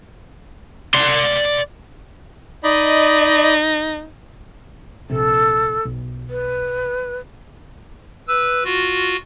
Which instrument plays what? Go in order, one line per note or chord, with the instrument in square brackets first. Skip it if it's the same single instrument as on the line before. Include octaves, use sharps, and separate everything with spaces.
[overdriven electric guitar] D5 C6
[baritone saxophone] D#4 [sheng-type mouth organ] D5 D#5 B5
[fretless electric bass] A#1 C3 [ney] A4
[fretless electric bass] B1
[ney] B4
[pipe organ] B4 E6
F4 F#4